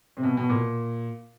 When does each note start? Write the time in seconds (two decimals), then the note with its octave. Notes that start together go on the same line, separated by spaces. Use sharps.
0.17 C3
0.23 B2
0.37 B2
0.49 A#2